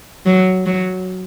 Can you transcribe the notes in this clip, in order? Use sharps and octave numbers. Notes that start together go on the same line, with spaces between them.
F#3
F#3